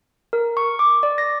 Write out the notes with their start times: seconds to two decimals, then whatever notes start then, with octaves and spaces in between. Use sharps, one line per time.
0.33 A#4
0.57 C#6
0.79 D6
1.03 D5
1.18 A#6